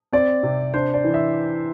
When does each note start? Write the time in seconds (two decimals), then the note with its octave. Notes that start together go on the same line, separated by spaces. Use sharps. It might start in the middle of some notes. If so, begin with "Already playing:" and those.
0.13 C4 D5
0.43 C3
0.74 D4 C5
0.94 D5
1.04 E3
1.14 E5